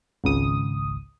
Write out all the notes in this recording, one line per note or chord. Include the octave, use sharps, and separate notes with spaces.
G#1 C#2 D#6